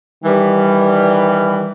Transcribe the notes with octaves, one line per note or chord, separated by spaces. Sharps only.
D#3 E3 G3